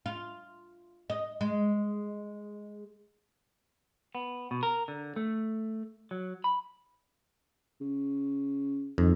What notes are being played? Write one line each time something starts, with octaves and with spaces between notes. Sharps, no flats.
F4
D#5
G#3
B3
B2
A#4
D3
A3
F#3
B5
C#3
F2 D#3